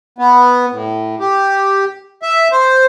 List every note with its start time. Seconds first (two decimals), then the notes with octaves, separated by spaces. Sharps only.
0.18 B3
0.72 A2
1.20 G4
2.22 E5
2.52 C5